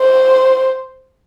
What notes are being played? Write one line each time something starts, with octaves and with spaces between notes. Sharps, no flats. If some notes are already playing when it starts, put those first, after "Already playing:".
Already playing: C5